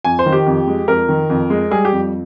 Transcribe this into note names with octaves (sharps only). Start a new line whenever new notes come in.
F2 G#5
C5
D#3
G4
F2
G#3
F2 A#4
D#3
F2
G#3
G3 G#4
G4
F2